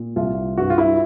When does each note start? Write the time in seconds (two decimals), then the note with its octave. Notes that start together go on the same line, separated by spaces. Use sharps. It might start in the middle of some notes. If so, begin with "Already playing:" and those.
Already playing: A#2
0.16 C2 F4
0.58 G2 F#4
0.70 F4
0.78 E4